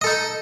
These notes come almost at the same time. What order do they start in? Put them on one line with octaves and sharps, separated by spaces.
D#5 A4 D#4